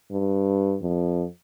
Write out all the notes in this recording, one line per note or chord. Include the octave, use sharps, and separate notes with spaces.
G2
F2